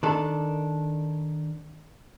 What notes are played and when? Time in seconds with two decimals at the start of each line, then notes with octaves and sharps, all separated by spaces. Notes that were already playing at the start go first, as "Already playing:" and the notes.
0.03 D#3 D4 A4